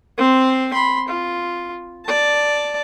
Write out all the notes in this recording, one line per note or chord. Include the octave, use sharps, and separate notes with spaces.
C4 C5
B5 C6
F4
D5 A5